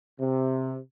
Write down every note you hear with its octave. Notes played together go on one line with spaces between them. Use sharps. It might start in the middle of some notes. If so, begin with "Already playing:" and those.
C3